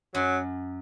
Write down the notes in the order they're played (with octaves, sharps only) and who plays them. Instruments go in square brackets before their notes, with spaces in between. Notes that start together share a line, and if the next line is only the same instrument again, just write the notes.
[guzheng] F#2 [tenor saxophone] F#3